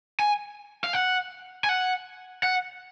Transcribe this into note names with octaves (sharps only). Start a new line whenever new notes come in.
G#5
F5
F#5
G#5
F#5
F#5